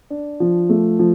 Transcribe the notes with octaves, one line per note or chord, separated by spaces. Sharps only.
D4
F3
A3
F3